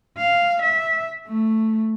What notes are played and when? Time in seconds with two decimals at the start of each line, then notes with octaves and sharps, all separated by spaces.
0.18 F5
0.62 E5
1.27 A3